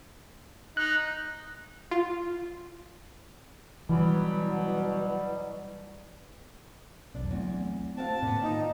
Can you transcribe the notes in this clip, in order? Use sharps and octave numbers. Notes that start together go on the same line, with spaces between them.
D#4 F#6
F4
B2 E3 F#3 G3
E1 B1 D4
E2 F#3 A3 C4
C4 F#4 F5 A5
A2 D3 A#3 B3
D#3 D#4 F4